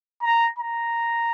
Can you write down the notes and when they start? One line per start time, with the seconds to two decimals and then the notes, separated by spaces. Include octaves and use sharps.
0.23 A#5
0.59 A#5